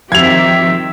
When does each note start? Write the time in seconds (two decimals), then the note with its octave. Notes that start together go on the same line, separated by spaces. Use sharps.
0.12 D#3 F3 C4 G4 E5 G#6 F7